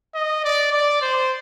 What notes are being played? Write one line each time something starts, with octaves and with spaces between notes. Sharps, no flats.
D#5
D5
D5
C5